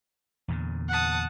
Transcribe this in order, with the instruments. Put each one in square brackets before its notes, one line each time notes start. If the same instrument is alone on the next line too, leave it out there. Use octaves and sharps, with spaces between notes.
[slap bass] E2 A#2 D3
[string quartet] F#5 A5 D#6